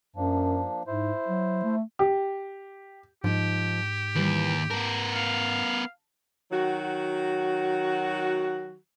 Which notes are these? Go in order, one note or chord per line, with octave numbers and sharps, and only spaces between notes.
F#2 F3 A#3 D4
G#2 E4 C5
F#3
A3
G4
G#2 F3 D#4 G4
D#2 E3 G3
B3 A#4 A5
F5
D#3 F#3 F#4